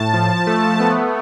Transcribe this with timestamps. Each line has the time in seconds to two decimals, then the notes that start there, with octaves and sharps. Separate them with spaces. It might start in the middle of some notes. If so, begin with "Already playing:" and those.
Already playing: A2 A5
0.14 F3
0.47 A3
0.80 B3